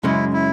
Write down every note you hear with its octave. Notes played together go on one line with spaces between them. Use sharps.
F#2 C#3 G#3 C#4 E4
E4